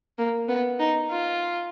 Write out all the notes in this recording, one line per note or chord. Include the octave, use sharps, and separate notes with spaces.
A#3
B3
D#4
F4